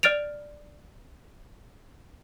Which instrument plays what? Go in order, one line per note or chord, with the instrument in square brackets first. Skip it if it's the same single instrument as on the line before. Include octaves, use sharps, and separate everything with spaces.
[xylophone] D5 F6 A6 D7 F7